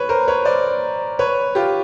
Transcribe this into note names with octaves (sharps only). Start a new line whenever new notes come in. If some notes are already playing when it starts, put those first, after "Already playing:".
Already playing: B4 C#5
A#4 C5
B4 C#5
C5 D5
B4 C#5
F4 G4